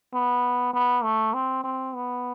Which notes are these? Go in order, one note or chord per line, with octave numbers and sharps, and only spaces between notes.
B3
B3
A3
C4
C4
B3